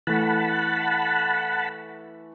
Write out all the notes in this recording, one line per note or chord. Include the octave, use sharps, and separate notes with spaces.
E3 A3 F#5 A5 B5